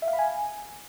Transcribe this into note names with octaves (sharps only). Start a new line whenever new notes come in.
E5
F5
B5
G#5